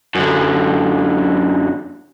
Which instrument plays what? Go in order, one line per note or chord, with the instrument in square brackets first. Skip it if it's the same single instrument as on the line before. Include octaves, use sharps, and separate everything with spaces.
[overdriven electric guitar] F#2 D3